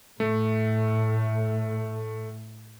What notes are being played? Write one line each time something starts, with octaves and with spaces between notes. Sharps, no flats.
A2 A3